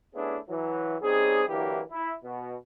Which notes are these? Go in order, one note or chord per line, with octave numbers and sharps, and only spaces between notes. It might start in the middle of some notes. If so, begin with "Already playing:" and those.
A3 B3 C#4 D4 E4 G#4
E3 F#3 E4
G3 C4 C#4 D#4 G#4
D3 E3 F#3 A#3 E4 G4
E4
B2